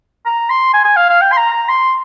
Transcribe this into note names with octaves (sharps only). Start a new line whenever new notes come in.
A#5
C6
G#5
G#5
F5
F5
G5
C6
A#5
A#5
C6